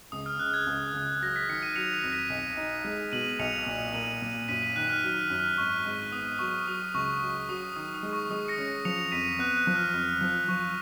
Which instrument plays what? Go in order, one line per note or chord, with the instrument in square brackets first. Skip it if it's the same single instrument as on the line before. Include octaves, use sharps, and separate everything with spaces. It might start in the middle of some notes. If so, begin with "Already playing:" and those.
[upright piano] C#2 [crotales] D#6
[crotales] F6
[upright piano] C#3 [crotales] F#6
[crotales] G#6
[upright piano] C#2
C#2
[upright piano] F#3 [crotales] A#6
[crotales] B6
[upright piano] D#3 [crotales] C#7
[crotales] D#7
[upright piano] F#3 [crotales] C#7 F7
[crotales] A#6 C#7
[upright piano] F2
[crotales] B6 D#7
[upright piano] B1
D#4
G#3
[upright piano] B2 [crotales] D#7 F#7
[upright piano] B1 [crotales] C#7 F7
[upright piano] A#2
[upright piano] A#3 [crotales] D#7 F#7
[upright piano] A#2
[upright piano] F#2 [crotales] B6 D#7
[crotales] B6 D#7
[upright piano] D#3 [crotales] F#6
[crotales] F6
[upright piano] F#3
[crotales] F6
[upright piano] F#2
[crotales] F6
[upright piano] G#1 [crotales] C#6
[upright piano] G#2
[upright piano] B3 [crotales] D#6
[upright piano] F#3 [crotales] C#6
[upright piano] F#3 [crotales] D#6
[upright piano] C#2 [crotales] C#6
[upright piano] F#3 [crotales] C#6
[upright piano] F#3 [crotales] D#6
[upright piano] D#3 [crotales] D#6
[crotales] D#6
[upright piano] G#3
[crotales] C#6
[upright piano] G#3 [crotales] D#6
[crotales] A#6 C#7
[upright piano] C#4
[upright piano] F3 [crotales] C#7 F7
[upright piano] F2 [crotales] B6 D#7
[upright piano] B3 [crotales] F#6
[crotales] F#6
[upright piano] F3
[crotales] F6
[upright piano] F2
F3
[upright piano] F3 [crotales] C#6